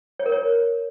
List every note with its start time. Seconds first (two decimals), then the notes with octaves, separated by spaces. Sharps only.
0.19 C#5
0.26 A#4
0.32 C#5